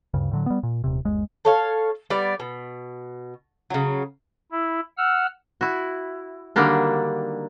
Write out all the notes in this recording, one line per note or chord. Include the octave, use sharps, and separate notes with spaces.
D2 G2 C#3
A2 D3 F#3
G3 B3
A#2
D#1 C3
G1 D#2 G#3
A4 C#5 F5
G3 B3 D5
B2
C#3 F#3
E4
F#5 E6 F6
E4 F#4
D3 D#3 F#3 G3 A#3 D4